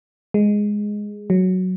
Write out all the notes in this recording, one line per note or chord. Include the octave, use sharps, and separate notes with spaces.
G#3
F#3